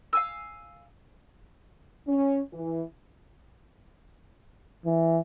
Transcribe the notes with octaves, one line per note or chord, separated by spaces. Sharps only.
F5 G#5 E6
C#4
E3
E3